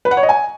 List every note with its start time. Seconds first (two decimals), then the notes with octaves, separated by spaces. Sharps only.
0.05 B4
0.11 F#5
0.17 C#5
0.23 D#5
0.29 G#5